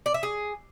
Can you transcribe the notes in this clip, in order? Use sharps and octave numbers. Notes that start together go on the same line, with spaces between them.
D5
E5
G#4